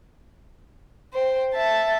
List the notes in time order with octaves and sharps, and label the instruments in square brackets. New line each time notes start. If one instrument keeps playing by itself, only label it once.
[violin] C5 G5
E5 A5